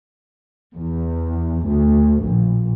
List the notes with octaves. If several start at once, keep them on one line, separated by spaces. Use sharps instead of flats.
E2
D2
A#1